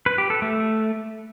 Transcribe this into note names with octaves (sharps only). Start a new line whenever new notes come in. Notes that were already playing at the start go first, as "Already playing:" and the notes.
B4
G4
A4
A3